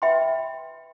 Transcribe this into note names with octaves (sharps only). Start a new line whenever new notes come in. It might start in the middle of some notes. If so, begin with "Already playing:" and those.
B4 E5 G5 B5 C6